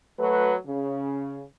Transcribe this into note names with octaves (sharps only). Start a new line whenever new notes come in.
F#3 A3 F#4 B4
C#3